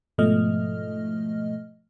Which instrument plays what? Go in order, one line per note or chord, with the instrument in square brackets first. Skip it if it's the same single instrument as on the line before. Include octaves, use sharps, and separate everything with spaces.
[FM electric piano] G#2 B2 F3 A3 D#5 F6